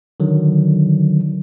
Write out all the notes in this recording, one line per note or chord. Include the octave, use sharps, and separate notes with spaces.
D3 D#3 F#3